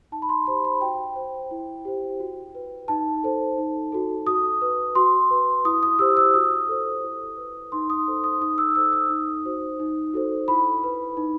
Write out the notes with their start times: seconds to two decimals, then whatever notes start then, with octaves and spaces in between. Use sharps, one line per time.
0.12 D#4 A5
0.22 B5
0.29 C6
0.47 G4 C5 B5
0.65 B5
0.81 F#4 G5
1.16 C5
1.51 E4
1.85 G4 C5
2.20 F#4
2.55 B4
2.88 D#4 A5
3.23 A4 C5
3.58 D#4
3.92 F#4 A4
4.27 F#4 D#6
4.62 B4
4.95 F#4 C6
5.31 B4
5.65 E4 D#6
5.83 D#6
5.99 G4 C5 E6
6.17 E6
6.34 F#4 D#6
6.68 A4 C5
7.03 E4
7.37 B4
7.72 D#4 C6
7.90 D#6
8.07 A4 C5
8.24 D#6
8.41 D#4 D#6
8.58 E6
8.75 A4 C5 E6
8.93 D#6
9.10 D#4
9.45 F#4 C5
9.80 D#4
10.14 F#4 A4 C5
10.48 E4 B5
10.84 B4
11.17 D#4